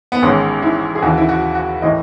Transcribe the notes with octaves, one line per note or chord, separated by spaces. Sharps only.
B3
A1 G#2 D#3 C#4
E4
G#4
D#2 C#3 E3 F#4
E4
F#4
F#4
A2 E3 D#5